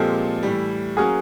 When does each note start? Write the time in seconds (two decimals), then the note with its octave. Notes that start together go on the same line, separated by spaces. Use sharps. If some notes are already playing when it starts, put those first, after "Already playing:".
Already playing: A#2 F3 G#3 C4 G4 A4
0.43 A2 E3 G3
0.97 F#3 A#3 C#4 F#4 G#4 A#4